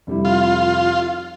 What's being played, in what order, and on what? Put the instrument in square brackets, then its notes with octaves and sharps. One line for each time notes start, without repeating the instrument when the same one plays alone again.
[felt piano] F1 G3 E4
[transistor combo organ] F4